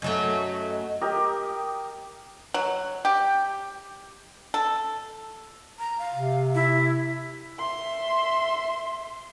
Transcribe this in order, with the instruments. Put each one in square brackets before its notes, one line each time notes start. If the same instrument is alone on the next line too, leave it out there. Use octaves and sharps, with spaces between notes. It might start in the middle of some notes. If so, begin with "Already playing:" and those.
[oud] F#2 F#3 A3 [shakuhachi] D#5
[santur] G4 A#4 D#5
[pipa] F#3
G4
A4
[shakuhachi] A#5
F5
[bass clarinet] C3
[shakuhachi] E4
[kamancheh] E5 C6